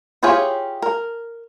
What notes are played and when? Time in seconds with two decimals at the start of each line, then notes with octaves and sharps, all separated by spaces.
0.23 E4 F4 G4 G#4 C#5
0.82 A#4